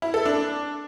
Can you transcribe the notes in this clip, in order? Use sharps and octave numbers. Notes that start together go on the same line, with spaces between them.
E4
A4
D4